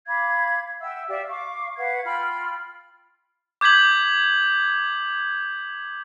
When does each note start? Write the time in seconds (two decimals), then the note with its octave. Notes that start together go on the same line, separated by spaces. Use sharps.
0.07 F5 B5 D6 G#6
0.81 E5 F#5 G5 E6
1.08 G4 D5 E5 F5
1.29 F5 C#6 D6
1.76 B4 F5 F#5 G#6
2.05 F4 G5 B5 F6
3.61 D6 G6 G#6 B6 F#7